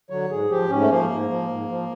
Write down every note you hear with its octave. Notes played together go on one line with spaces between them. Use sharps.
D3 F#3 C#5
G#2 G#4
F3 G4
G#2 C#4
A3
F3 A#3
G#2
F3
G#2
F3